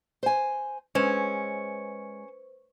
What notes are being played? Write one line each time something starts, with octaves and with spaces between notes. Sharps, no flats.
C5 G#5
G#3 C#4 B4 C5